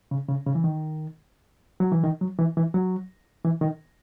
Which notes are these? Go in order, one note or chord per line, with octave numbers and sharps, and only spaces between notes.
C#3
C#3
C#3
E3
D#3
F#3
E3
D#3
F#3
E3
E3
F#3
E3
D#3